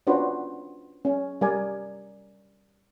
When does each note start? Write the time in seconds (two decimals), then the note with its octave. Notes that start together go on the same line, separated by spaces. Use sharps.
0.07 C#4 D4 F4 F#4 B4 C5
1.05 C#4
1.41 G3 A#4 D5 G#5